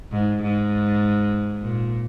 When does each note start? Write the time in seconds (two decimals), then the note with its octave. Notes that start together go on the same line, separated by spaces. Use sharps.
0.12 G#2
0.42 G#2
1.62 A#2